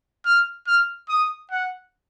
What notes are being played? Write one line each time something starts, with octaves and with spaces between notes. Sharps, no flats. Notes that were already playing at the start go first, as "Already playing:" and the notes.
F6
F6
D#6
F#5